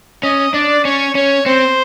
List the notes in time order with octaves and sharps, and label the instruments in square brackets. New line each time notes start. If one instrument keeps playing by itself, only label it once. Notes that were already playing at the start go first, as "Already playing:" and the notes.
[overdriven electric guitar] C#4 [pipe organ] D#5
[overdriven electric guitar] D4 [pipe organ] D5
[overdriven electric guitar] C#4 [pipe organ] C#5
[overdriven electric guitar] C#4 [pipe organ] C#5
[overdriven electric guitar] C4 [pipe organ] C5